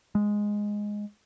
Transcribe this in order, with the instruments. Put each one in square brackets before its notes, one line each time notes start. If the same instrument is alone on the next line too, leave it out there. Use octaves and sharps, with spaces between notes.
[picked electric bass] G#3